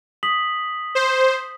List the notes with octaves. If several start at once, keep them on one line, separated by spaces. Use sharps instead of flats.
D#6 B6 F#7
C5